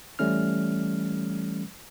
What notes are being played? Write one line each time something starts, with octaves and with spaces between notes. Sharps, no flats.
E3 G3 A3 C#4 F6